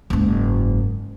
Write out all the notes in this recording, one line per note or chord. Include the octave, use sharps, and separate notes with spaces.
F#1 G#2